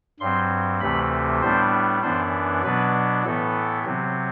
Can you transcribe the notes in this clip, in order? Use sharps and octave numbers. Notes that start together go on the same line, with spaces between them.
G2 F#3 C4 C6
D2 C3 E3 A3 C4 B5
A2 G3 B3 D4 C5
F#2 E3 B3 D4 C5
B2 F#3 B3 D4 B4
A2 E3 B3 A4
C3 F#3 C4